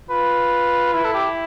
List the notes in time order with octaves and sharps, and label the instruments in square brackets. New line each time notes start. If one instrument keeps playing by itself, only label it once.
[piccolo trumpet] F4 [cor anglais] B4
[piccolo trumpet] E4 [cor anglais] B4
[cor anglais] A4
G4